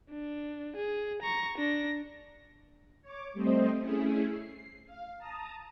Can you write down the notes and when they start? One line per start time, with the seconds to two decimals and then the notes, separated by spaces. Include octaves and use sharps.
0.10 D4
0.76 G#4
1.22 A#5 C#6
1.58 D4 A#6
3.02 C#5 D6
3.33 G3 A3 C4 C5 D#5
3.79 A3 C#4 E4 G#4
4.29 C7
4.86 F5
5.18 A5 A#5 D#6